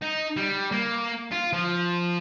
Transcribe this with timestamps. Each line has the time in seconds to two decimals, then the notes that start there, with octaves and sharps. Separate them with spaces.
0.02 D#4
0.36 G3
0.72 A#3
1.32 F4
1.53 F3